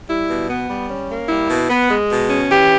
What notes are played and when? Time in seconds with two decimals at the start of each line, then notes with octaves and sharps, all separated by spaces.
0.08 G3 E4
0.28 B2
0.49 B3
0.68 G3
0.88 C#4
1.09 A#3
1.28 G3 E4
1.48 B2
1.69 B3
1.89 G#3
2.09 B2
2.29 C#4
2.50 E3 G4